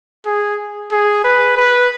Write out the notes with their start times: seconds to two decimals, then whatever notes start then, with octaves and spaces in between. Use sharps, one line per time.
0.26 G#4
0.92 G#4
1.24 B4
1.57 B4